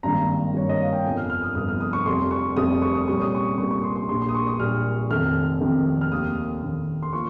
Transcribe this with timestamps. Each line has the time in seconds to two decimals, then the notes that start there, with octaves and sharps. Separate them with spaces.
0.03 G#1 G2 D#3 A#3 A#5
0.54 G#1 G2 D#3 A#3 C#5
0.69 D#5
0.81 F5
0.93 G5
1.04 G1 F2 C3 F3 G#5
1.17 F6
1.30 F6
1.42 D#6
1.55 G1 F2 C3 F3 D#6
1.68 F6
1.80 D#6
1.93 C#6
2.06 F1 F2 C3 G3 C6
2.31 C#6
2.56 F1 F2 C3 G3 D#6
2.82 C#6
2.95 D#6
3.07 C2 A#2 G3 C#4 C#6
3.22 D#6
3.35 C#6
3.58 C2 A#2 G3 C#4 C#6
3.71 C#6
3.83 C6
3.96 C6
4.09 A#1 A#2 G3 A#3 C6
4.22 C6
4.29 D#6
4.35 C#6
4.47 D#6
4.60 A#1 A#2 G3 A#3 F6
5.10 F1 F2 C3 D#3 F6
5.61 F1 F2 C3 D#3
6.01 F6
6.12 F1 D#2 D#3 D#6
6.63 F1 D#2 D#3
7.03 C6
7.13 F3 A#3 C#6